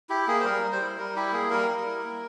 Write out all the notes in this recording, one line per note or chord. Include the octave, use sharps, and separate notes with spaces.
E4 G4
A#3 G#4
C5
G3 A#4
G3
C5
E4
G3 A#4
E4 G4
A#3 G#4
G3 A#4
G3
E4
A#3